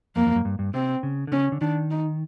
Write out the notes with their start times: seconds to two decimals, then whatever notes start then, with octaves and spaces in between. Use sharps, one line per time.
0.15 F2 A#3
0.26 F2
0.35 F#2
0.45 G2
0.59 G2
0.74 C3 C4
1.03 C#3
1.27 D3
1.32 C#3 C#4
1.52 D3
1.61 D#3 D4
1.91 D#4